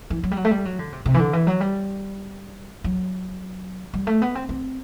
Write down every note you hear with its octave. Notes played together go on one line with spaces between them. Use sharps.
E3
F#3
G3
F#3
A3
G3
F#3
D3
C3
C3
E3
D3
E3
F#3
G3
F#3
G3
A3
B3
C4
C4